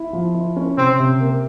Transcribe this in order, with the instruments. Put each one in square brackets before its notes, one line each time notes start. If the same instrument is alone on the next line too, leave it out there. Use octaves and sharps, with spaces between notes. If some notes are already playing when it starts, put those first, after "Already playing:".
Already playing: [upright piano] E4
F3
E4
C#4
[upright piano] C3 [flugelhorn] C4
[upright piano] C3
A#3